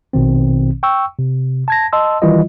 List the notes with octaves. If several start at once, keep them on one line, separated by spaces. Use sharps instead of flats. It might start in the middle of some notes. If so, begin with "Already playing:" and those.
A#1 B2 D#3 C4
G5 C#6 E6
C3
A5 G#6 A#6
D#5 A5 C6 E6
D#3 E3 G3 E4 F4 D#5